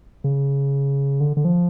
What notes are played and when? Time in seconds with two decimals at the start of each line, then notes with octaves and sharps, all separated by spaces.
0.24 C#3
1.20 D3
1.37 D3
1.45 F3